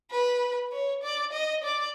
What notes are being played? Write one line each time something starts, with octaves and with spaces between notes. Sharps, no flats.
B4
C#5
D5
D#5
D5